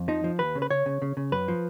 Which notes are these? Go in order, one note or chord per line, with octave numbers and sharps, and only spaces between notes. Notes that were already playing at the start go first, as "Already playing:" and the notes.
Already playing: F2
F3 D#4
F3
D#2 B4
C#3
B4
C#3 C#5
C#3
C#3
C#3
F#2 B4
F3